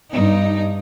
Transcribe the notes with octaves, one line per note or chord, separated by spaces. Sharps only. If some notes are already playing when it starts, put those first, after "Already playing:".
G2 D#4